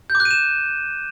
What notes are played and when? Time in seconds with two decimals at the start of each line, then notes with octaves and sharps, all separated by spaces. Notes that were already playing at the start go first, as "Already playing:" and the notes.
0.10 G6
0.15 D6
0.20 F#6
0.25 D#7
0.31 E7